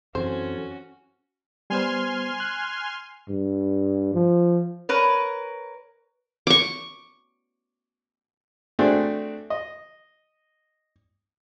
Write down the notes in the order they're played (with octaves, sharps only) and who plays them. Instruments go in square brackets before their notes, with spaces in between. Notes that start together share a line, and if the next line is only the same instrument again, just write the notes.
[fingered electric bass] F#2 E3 [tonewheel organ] C4 A4 G#5 [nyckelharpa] C#4 F#4 [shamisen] C5
[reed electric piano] G3 B3 C5 [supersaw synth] G#5 C6 F6
[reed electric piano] F#6
[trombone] G2
F3
[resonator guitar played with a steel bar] A#4 B4 C#5
[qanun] C#6 D6
[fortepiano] A3 C4 D4 F#4 G#4
D#5